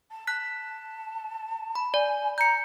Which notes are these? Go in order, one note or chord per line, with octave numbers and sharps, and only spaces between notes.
A5
A5 F#6 B6
B5
D5 G#5
A#5 G6 C#7